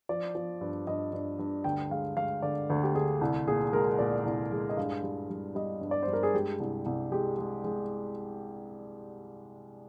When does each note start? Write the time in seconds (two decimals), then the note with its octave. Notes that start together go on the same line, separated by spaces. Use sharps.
0.09 F3 D5
0.35 F3
0.61 G2
0.87 G2 D#5
1.13 G2
1.39 G2
1.64 D2 G5
1.91 G#3 F5
2.16 G#3 F5
2.42 D3 D5
2.70 D2
2.83 G4
2.95 D2 G#4
3.21 C2
3.47 A#2 G#4
3.73 G#3 A#4
3.99 A#2 D5
4.26 C2
4.52 G#3
4.69 D#5
4.77 G2 F5
5.03 G3
5.29 G3
5.55 G3 D#5
5.81 G2
5.91 D5
6.03 G2 C5
6.13 A#4
6.23 G#4
6.34 G#3 G4
6.60 C2
6.86 C2
7.12 G#3 G4
7.38 G#3
7.64 G#3